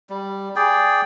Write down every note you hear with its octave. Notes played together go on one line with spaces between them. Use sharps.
G3
G#4 D5 G5